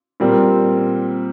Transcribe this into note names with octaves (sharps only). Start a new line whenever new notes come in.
A#2 G3 C4 G4 A#4